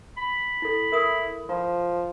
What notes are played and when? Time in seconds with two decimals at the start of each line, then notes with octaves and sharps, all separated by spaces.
0.17 B5
0.62 E4 A4
0.92 E4 A#4 D#6
1.49 F3 F4